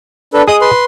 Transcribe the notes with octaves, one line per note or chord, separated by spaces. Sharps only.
D4 A4 B4
G#4 D#5 D#6
B4 C6